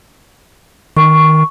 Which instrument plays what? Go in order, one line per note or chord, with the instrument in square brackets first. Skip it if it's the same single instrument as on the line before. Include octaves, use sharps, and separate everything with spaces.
[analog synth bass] D#3 [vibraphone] C#6